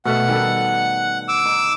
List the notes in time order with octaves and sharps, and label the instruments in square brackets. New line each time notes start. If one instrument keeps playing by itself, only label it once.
[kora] B2 A3 E5 [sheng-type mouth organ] F#5
[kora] D#3 G3 A4
[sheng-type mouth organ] D6 E6
[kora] D#4